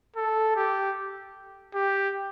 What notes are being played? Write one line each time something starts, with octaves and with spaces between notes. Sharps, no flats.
A4
G4
G4